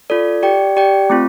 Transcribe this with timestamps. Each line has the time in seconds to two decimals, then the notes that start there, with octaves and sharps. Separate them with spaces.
0.10 F4 A4 D5
0.43 G4 D5 G5
0.77 G4 D5 G5
1.10 A3 C4 F4